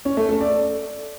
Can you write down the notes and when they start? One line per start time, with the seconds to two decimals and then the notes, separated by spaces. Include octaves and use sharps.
0.05 C#4
0.17 A3
0.29 A4
0.41 D5